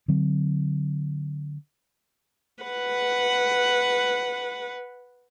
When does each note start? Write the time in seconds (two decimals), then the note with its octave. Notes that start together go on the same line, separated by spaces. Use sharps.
0.08 D3 F#3 C4
2.64 B4 F#5